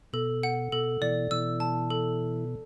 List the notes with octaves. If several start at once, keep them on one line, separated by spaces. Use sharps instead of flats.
B2 A4
F#5
B2 A4
B2 E3 D5
B2 E3 E6
A5
A4